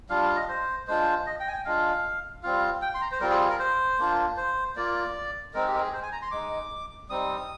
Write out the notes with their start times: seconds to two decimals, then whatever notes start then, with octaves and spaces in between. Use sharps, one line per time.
0.09 G3 D4 F4 F5
0.23 F5
0.36 D#5
0.49 C5
0.88 G#3 D4 F4 C5
1.26 D#5
1.40 G5
1.48 G#5
1.52 G5
1.65 G#3 D4 F4 F5
2.43 G3 C4 F4 F5
2.82 G5
2.95 C6
3.01 A#5
3.12 C5
3.20 G3 C4 F4 A#4
3.30 G#4
3.40 G#4
3.49 A#4
3.59 C5
3.98 A#3 D4 F4
4.37 C5
4.76 A#3 F4 D5
5.54 G#3 C4 D#4 A#4
5.67 G4
5.75 A#4
5.80 G#4
5.93 C5
6.03 G#5
6.12 A#5
6.22 C6
6.31 G#3 D#4 D6
7.09 G3 C4 D#4 D#6